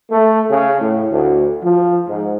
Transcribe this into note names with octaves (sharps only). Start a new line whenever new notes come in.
A3
C#3
A2
D2
F3
G#2